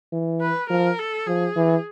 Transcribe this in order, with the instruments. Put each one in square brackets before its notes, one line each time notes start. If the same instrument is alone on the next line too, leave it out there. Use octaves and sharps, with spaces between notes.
[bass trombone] E3
[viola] B4
[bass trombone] F3 [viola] A#4
[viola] A4
[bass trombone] F3 [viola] G#4
[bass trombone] E3